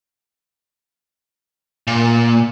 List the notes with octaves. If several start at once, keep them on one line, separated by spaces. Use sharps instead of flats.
A#2